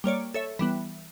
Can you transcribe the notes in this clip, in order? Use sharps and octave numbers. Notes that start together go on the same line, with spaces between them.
G3 A#3 C#5 D5
A4 C#5 E5
E3 G3 B3